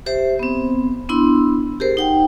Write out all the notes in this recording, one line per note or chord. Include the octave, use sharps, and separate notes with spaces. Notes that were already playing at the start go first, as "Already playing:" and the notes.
G4 C5 E5
B3 C4
B3 D4 E4 C6 E6
G4 G#4 A#4 C5
D#4 F#5 G5